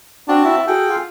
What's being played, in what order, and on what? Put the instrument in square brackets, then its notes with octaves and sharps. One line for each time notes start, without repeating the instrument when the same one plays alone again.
[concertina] C4 F#4 A5 [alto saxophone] D4
[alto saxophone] E4
[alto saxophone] F#4 [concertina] G#4 A4 G5
[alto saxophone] F4